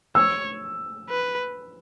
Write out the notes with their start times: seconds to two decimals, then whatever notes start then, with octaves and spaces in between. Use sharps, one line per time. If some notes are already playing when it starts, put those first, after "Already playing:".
0.15 C#5 E6
1.09 B4